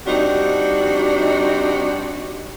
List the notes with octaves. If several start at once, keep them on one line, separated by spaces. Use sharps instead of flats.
G3 C4 D4 D#4 F#4 G4